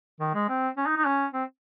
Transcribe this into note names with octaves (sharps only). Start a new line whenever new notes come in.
D#3
G#3
C4
C#4
D#4
D#4
C#4
C4